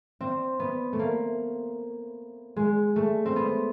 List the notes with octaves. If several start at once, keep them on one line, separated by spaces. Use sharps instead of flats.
C4
B3
A3
A#3
G#3
A3
C4
B3